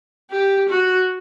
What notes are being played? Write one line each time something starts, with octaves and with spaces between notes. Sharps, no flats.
G4
F#4